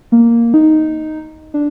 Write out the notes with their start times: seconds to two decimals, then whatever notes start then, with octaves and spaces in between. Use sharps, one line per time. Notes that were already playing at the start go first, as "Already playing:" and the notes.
0.12 A#3
0.54 D#4
1.54 D4